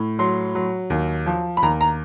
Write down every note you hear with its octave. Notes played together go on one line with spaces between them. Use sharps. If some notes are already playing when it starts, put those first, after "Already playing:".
Already playing: A2
F#3 C6
F#3
D#2
F3
B5
D#2 A#5
A#5